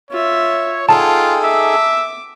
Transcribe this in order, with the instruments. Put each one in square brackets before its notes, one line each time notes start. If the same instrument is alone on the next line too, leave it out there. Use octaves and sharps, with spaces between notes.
[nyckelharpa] F4 E5 [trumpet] C#5
[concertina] D#4 G#4 A4 [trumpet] F4 [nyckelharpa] F#5 G5 [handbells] A5
[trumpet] E5 [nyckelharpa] D6